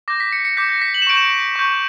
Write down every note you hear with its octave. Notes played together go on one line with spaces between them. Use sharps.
D6 G6 A#6
B6
C#7
C#7
D6 G6 B6
A#6
B6
F#7
E7
C#6 G6 D7
E7
C#6 G6